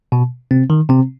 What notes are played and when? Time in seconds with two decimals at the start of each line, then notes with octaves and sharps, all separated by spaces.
0.12 B2
0.51 C3 C4
0.70 D#3
0.89 C3 C4